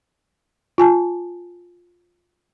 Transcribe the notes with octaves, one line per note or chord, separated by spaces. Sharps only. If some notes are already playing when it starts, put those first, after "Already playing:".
F4 G#5 A5